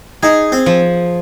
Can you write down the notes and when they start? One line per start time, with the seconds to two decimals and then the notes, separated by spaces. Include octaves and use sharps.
0.22 D#4 G#4
0.52 C4
0.66 F3